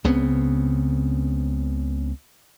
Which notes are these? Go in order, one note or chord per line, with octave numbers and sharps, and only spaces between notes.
C#2 C#3 B3 C4